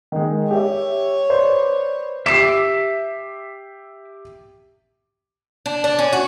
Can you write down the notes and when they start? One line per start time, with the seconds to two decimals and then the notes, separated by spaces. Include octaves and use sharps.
0.12 D#3 G#3
0.51 G4 C#5 E5
1.30 B4 C5 D5
2.26 G4 E5 D6 C7 E7
5.66 D4
5.84 D4
5.99 C#4
6.13 F#4